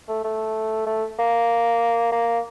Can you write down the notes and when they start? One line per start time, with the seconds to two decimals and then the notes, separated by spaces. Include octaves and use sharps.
0.09 A3
0.24 A3
0.87 A3
1.19 A#3
2.12 A#3